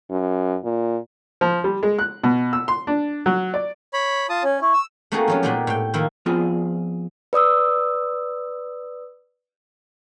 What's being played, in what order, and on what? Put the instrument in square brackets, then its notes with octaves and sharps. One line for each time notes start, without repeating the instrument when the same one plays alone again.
[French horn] F#2
A#2
[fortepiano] F3
G3
G#3
F#6
B2
E6
C6
D4
F#3
D5
[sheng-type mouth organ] C#5 B5
F4 A5 D#6
[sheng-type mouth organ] C#4 [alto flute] C#5
[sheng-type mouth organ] E4 [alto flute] C#6
[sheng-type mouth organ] E6
[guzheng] A3 A#3 C4 D#4 F#4 G#4
F3 F#3 C#4
A#2 G#3 B3 D#4 G4 D5
A2 G5
D#3 F3 A#3 E4
[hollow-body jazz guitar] F3 B3 C4 F4 G#4
[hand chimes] B4 D5 D#6 E6